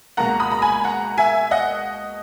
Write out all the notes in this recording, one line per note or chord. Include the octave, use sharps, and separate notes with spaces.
C#2 B2 A#3 F#5 A#5
B5 D#6
A#5
G#5 B5
F#5 A#5
E5 G#5
D#5 F#5